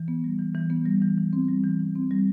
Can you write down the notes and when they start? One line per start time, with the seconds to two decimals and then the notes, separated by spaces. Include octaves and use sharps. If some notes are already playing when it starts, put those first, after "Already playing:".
Already playing: E3
0.08 B3
0.24 G3
0.39 E3
0.55 E3
0.70 B3
0.86 G3
1.02 E3
1.18 E3
1.33 C4
1.48 G3
1.64 E3
1.79 E3
1.96 C4
2.11 G3